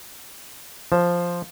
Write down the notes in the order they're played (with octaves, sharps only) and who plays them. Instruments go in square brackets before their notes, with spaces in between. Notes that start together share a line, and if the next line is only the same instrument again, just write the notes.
[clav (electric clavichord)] F3 [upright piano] C5